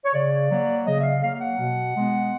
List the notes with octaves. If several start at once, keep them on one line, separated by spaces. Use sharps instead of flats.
C#5
C#3 D5
F#3 A#3
C#3 D#5
E5
F5
F#3 A#3 F5
F5
F#5
B2
G#3 B3